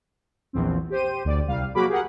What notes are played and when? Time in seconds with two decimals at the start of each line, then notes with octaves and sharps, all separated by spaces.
0.53 A#1 E2 C4
0.90 G4 C5 D#7
1.25 D2 D5
1.48 C2 G3 F5
1.75 F#3 A#3 F#4 G#4 B5 D6
1.88 G4 G#4 A#4 F#5